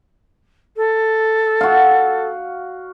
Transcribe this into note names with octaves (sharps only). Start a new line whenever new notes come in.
A4
F#4 F5